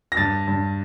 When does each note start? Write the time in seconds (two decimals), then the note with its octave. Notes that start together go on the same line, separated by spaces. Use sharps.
0.12 A#6
0.17 G2 A6
0.47 G2